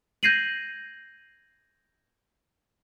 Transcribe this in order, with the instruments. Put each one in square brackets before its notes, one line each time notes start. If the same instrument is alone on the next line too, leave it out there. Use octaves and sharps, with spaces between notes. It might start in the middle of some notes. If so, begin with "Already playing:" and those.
[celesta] G6 G#6 A#6 C7 D#7 F#7